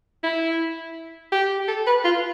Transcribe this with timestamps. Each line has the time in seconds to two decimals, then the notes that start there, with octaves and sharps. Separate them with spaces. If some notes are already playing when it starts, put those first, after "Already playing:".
0.24 E4
1.32 G4
1.68 A4
1.87 B4
2.04 F4